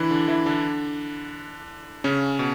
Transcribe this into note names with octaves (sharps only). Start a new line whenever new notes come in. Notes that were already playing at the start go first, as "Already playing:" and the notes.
Already playing: D3 E3 D4 E4
D3 D4
E3 E4
D3 D4
C#3 C#4
B2